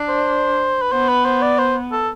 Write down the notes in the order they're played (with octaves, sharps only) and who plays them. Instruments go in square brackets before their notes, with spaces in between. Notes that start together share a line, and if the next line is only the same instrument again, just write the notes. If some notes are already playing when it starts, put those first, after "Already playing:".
Already playing: [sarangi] D4
[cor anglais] C5
B4
[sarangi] B3 [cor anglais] C5
[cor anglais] B4
C5
D5
C5
A4